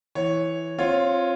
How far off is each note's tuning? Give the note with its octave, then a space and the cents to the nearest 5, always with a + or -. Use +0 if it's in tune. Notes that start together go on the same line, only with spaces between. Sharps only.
E3 -5 C#5 -5
C4 +25 F4 +0 C#5 +0